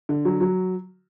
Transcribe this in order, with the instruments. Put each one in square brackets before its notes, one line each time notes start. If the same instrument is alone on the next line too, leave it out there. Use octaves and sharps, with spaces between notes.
[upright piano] D3
F#3
F#3